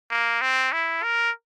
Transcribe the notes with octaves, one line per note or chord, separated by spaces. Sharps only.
A#3
C4
E4
A#4